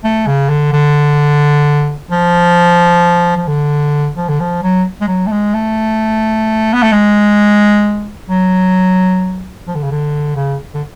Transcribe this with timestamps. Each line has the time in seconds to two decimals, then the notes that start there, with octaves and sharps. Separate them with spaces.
0.04 A3
0.27 C#3
0.49 D3
0.72 D3
2.11 F3
3.36 F3
3.47 D3
4.17 F3
4.28 D3
4.40 F3
4.63 F#3
5.01 G#3
5.08 F#3
5.26 A3
5.31 G#3
5.54 A3
6.73 B3
6.83 A3
6.92 G#3
8.30 F#3
9.67 F3
9.75 D3
9.83 C#3
9.91 D3
10.36 C#3
10.74 D3